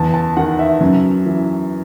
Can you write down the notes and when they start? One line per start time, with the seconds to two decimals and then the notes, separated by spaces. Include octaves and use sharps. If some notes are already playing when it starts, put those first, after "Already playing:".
Already playing: E2 A5
0.14 A5
0.37 D#3 F#5
0.59 E5
0.81 F#2
1.26 E3